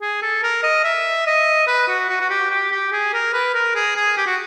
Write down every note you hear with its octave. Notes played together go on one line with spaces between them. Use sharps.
G#4
A4
A#4
D#5
E5
D#5
B4
F#4
F#4
F#4
G4
G4
G4
G#4
A#4
B4
A#4
G#4
G#4
G4
F#4